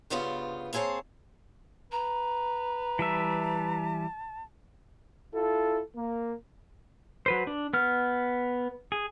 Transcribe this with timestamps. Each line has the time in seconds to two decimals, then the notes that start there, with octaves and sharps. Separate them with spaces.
0.10 G2 C#3 B3 F4 C5
0.73 A#3 C4 G#4 C5 C#5 A5
1.92 B4 A#5
2.99 E3 G3 E5 A5
5.34 E4 F4 A4
5.95 A#3
7.26 F#3 B4 C5
7.47 D4
7.73 B3 F6
8.92 G#4